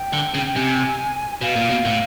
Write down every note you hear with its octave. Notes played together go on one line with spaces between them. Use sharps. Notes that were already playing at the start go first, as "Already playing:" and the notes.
Already playing: G5
D3
C#3
G5
C3 G#5
B2 F5
A#2
B2
A2